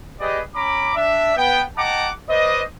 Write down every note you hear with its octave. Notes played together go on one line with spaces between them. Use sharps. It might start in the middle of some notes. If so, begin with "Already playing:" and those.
G4 G#4 B4 D5 D#5
C#4 A#5 B5 D6
D4 E5
B3 G5
D#5 F#5 G5 A5 A#5 D6
B4 C5 D5 D#5